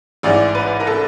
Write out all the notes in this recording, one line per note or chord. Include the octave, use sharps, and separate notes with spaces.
A1 G#2 E3 D5
B4
A#4
A4